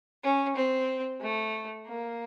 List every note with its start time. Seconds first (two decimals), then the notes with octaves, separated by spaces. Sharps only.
0.23 C#4
0.56 C4
1.21 A3
1.86 A#3